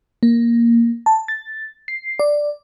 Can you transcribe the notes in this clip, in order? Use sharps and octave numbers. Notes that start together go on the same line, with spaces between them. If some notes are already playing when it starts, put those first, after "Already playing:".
A#3
A5
A6
C7
D5